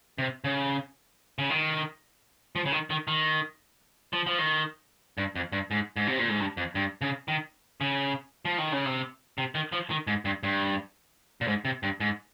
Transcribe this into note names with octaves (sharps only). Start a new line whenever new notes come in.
C3
C#3
C#3
D#3
F3
C#3
D#3
D#3
D#3
F3
F3
D#3
G2
F2
G2
G#2
G#2
C3
A#2
G#2
G2
F2
G2
C#3
D#3
C#3
F3
D#3
C#3
C3
C3
D#3
F3
D#3
G#2
G2
G2
A#2
G#2
C3
G2
G#2